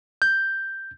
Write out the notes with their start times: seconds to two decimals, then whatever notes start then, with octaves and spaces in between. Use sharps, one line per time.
0.22 G6